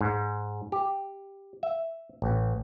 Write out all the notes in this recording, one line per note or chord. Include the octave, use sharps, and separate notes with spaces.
G#2
G4
E5
A1